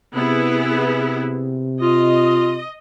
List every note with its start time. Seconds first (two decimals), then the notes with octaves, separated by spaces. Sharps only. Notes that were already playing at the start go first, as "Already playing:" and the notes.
0.15 C3 B3 E4 G#4
1.81 F4 D#5